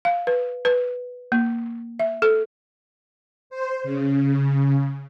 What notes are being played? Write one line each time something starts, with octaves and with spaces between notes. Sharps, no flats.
F5
B4
B4
A#3
E5
A4
C5
C#3